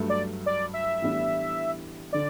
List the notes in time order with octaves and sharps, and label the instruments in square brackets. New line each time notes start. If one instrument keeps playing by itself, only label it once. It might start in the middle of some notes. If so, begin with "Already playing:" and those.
Already playing: [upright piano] G2 F#3 A3
[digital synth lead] D5
D5
E5
[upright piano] A2 E3 G3 B3 D4
[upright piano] D3 [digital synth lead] D5